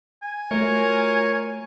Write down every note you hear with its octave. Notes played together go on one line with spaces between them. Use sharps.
G#5
A3 F4 F#4 A#4 C#5